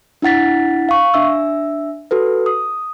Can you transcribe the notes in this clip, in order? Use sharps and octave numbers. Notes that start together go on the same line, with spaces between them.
D4 E4 F#5 A6 B6
F5 C#6
D4 E5 E6
F#4 A4 B4
D#6